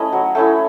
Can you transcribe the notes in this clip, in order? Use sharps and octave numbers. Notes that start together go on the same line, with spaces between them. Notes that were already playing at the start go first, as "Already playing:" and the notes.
Already playing: A3 C#4 E4 D#5
F#3
A3 C#4 E4